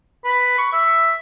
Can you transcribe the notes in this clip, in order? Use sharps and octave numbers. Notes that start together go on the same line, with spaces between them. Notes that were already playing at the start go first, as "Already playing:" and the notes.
B4
C#6
E5